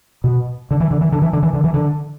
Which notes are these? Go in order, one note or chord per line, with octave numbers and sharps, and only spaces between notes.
B2
D3
E3
D3
E3
D3
E3
D3
E3
D3
E3
D3